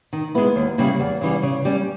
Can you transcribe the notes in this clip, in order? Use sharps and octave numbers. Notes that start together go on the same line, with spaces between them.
D#3
G#3 B3 E4
D#2
C#3 G3 A#3 E4
E2
C#3 E3 G3
C#3
G3 C#4